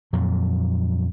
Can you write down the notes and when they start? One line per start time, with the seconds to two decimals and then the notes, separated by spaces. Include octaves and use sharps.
0.13 F2 A#2 F#3